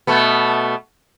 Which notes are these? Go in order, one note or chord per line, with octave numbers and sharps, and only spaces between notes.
B2 A3 B3